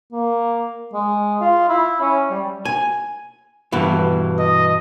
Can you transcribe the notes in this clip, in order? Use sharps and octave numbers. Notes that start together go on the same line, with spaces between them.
A#3
G#3
F4
E4
C#4
G3
G#5
G2 B2 E3
D#5